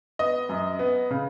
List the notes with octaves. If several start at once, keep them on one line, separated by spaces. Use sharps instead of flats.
B3 D#5
F#2
B3
C#3